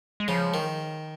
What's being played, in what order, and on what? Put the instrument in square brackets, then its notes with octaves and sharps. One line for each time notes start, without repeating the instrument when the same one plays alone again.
[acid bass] G#3
[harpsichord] C#3 [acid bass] F3
[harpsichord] D#3